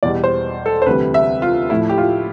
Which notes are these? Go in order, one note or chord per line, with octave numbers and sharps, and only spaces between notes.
E2 B2 G3 D5
C5
A4
C5
D2 C3 E3 G3 B4
E5
F4
A2 F3 A3 E4
G4
F4